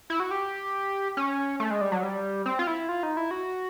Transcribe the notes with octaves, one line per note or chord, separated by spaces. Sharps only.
E4
F#4
G4
C#4
A3
G#3
G3
F#3
G3
C4
F4
E4
F4
D#4
E4
F#4